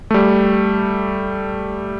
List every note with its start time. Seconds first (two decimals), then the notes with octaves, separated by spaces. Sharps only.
0.11 G3 A3